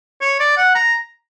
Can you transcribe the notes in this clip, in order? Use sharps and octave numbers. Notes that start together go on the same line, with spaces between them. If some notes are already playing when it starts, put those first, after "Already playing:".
C#5
D5
F#5
A#5